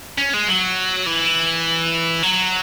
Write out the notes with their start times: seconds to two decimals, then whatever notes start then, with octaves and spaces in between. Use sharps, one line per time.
0.18 C#4
0.33 G#3
0.48 F#3
1.06 E3
2.23 F#3